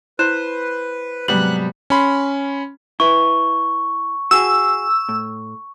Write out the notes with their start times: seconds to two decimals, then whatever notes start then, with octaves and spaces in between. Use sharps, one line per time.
0.19 E4 B4 C5 F#6 E7
1.28 G#2 C3 F#3 G3 B3 F#6 F#7
1.90 C#4 B5 C6
3.00 E4 B4 C#6
4.31 F#4 G#4 E6
5.09 A2